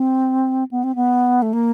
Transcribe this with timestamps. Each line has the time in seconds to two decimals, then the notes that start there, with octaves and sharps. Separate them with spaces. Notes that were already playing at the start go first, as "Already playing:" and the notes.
Already playing: C4
0.71 B3
0.84 C4
0.95 B3
1.42 A3
1.53 A#3